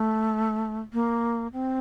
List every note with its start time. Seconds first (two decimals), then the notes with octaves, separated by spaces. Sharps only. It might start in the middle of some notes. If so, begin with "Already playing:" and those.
Already playing: A3
0.93 A#3
1.53 C4